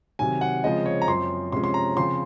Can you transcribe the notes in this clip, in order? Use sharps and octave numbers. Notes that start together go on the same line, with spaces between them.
C3 D#3 F#3 G#5
F#5
C#3 F3 G#3 C4 D#5
C#5
A#5
F#2 F3 C4 C6
C3 F3 G#3 C#4 C6
C6
A#5
C#3 F3 C4 C6